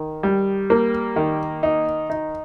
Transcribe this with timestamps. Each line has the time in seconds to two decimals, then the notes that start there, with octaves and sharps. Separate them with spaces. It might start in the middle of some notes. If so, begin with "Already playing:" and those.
Already playing: D#3
0.23 G3
0.70 A#3
1.16 D#3
1.63 D#4
2.10 D#4